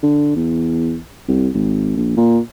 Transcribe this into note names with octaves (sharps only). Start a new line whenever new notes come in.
D3
E2
C2
G#1
A#1
A#2